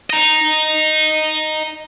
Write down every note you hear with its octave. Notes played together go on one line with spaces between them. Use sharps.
D#5 A#5